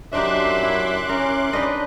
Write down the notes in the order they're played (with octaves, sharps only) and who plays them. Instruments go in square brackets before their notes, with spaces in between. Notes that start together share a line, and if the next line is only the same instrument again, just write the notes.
[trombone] F#2 [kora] D4 D#4 G4 [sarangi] E5 [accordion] C6 D6 F#6
[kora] E4
[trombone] C#4 [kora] A#4
[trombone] D4 [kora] D#4 B4 D#5